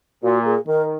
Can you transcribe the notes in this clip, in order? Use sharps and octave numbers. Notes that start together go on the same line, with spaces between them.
A#2 F#4
G#4
D#3 A#4